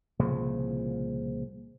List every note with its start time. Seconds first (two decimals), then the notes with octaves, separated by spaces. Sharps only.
0.19 C2 A#2 C#3 F3